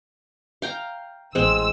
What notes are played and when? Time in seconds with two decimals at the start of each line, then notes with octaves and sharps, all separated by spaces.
0.62 F5 G5 A#5
1.35 A1 G#3 C4 E6